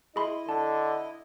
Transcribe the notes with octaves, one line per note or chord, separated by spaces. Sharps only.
E4 G#4 D#5 B5 C6
D3 A5